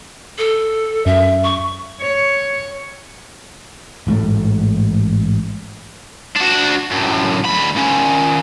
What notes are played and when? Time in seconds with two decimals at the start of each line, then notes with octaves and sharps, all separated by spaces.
0.38 A4
1.06 F#2 E5
1.44 C#6
2.01 C#5
4.07 A1 G#2 C3 A3
6.36 D4 F#4
6.91 F#2 A2
7.45 D2 B5
7.76 D#3 C#4